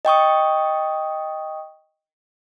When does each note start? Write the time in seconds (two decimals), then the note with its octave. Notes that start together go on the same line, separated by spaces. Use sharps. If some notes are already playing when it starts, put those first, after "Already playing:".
0.05 D#5 G5 C#6 D#6